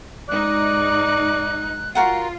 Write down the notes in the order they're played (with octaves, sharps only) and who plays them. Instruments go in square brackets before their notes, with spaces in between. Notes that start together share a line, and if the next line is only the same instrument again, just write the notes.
[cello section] G#2 D#4 [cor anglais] D5 [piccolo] F#6
[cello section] F4 [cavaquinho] F#4 A#4 F#5